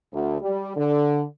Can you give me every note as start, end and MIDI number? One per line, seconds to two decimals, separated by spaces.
0.13 0.38 38
0.42 0.72 55
0.77 1.23 50